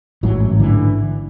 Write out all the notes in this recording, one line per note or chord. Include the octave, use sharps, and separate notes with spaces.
A1 G#2 E3 F#3
D3 E3